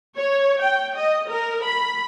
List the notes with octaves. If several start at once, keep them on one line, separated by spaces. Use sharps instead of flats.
C#5
G5
D#5
A#4
B5